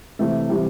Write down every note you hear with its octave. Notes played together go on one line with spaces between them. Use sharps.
C3 E3 A3
C3 E3 G3